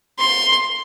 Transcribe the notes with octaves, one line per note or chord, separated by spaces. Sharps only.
C6